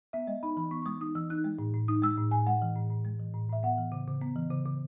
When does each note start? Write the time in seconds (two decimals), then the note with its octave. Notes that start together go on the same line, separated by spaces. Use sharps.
0.13 B3 E5
0.27 G#3 D#5
0.43 D#4 B5
0.57 E3 B5
0.71 B3 C#6
0.82 C#6
0.86 G#3 D#6
1.01 D#4 D#6
1.15 E3 E6
1.30 D#4 F#6
1.45 G#3
1.59 A2
1.74 A2
1.88 D#4 D#6
2.02 G#3 E6
2.17 A2
2.31 A2 G#5
2.47 G#3 F#5
2.62 E3
2.76 A2
2.90 A2
3.05 G#3
3.20 E3
3.34 A2
3.49 A2 E5
3.63 B3 F#5
3.78 E3
3.92 C#3
4.07 C#3
4.22 B3
4.36 E3
4.51 C#3
4.65 C#3